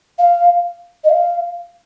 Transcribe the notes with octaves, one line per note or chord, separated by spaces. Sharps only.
F5
D#5
F5